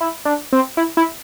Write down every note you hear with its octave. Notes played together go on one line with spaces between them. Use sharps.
E4
D4
C4
E4
E4